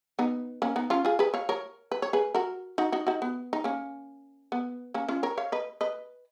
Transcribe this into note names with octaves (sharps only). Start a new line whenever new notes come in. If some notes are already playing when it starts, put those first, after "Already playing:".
B3 D#4
A#3 C#4
B3 D#4
C#4 F4
F4 G#4
G#4 B4
C#5 F5
A#4 C#5
B4
C#5
G#4 B4
F#4 A#4
D#4 F#4
D#4 F#4
D#4 F#4
B3
D#4
A#3 C#4
B3
A#3 C#4
C#4 F4
A#4 C#5
C#5 F5
B4 D#5
B4 D#5